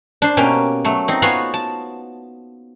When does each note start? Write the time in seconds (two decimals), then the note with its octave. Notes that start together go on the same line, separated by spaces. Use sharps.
0.22 D4 C5
0.37 B2 A#3 C#4 G4
0.85 F#3 A3
1.08 C4 D#4
1.22 B3 F4 F#4 C#5 F5 G#5
1.54 A5